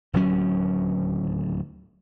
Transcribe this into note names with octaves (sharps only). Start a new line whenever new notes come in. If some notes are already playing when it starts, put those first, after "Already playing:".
D1 D#2 F#3 C#4